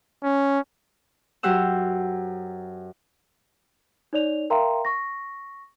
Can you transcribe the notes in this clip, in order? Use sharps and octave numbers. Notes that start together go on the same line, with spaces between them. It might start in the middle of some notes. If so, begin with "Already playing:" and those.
C#4
F#2 F#3 G4 C5 F#5 E6
D#4 C#5 D5 F7
A#4 E5 F5 G5 A#5 C6
C#6 A#6